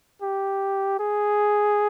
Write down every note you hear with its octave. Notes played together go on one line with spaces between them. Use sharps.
G4
G#4